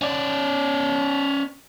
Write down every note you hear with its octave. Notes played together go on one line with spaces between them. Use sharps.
C#4 D5